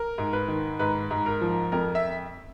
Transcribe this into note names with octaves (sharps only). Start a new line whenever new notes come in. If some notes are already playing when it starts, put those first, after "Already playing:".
Already playing: A#4
G#2
B4
D#3
G#2 B4
G#2
A#4
F3
F2 A#4
E5